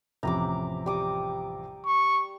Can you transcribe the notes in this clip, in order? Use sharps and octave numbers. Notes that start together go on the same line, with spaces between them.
A1 F2 C3 A#5 B5 D6
G3 D6 D#6
C#6